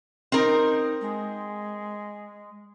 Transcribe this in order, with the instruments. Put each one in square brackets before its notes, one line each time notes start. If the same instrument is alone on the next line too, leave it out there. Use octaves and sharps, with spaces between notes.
[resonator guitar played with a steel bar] C4 A#4 [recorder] D#4
[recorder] G#3